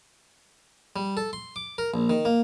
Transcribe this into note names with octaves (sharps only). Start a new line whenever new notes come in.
G3
A4
C6
D6
A#4
A#1
D#3
A#3